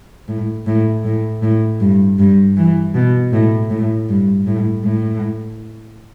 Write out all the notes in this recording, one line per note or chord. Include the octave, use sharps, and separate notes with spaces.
A2
A2
A2
A2
G2
G2
E3
B2
A2
A2
G2
A2
A2